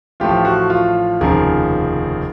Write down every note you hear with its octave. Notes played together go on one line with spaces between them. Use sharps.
A1 A2 F3 F4 G4
F#4
F4
F1 D#2 C#3 F3 G#4 A#4